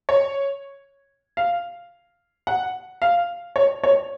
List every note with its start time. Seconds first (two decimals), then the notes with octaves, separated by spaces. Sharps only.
0.09 C#5
1.37 F5
2.47 F#5
3.02 F5
3.56 C#5
3.83 C#5